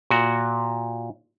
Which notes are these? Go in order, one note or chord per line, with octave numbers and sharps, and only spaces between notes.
A#2 F#4